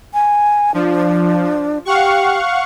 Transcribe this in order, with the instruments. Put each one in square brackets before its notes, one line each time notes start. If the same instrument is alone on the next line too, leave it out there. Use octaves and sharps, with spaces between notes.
[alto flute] G#5
[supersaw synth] F3 [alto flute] D4
[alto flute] G4 [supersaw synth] F5 F#5 C#6